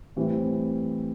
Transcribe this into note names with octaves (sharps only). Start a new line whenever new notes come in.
A2 E3 G3 C4